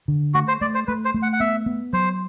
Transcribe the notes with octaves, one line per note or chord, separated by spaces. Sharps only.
D3
A3 F#4
C5
A3 D5
C5
A3 B4
C5
A3
F#5
F#5
B3 E5
B3
F#3 C5